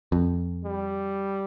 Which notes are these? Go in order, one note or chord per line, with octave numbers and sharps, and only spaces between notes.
F2
G3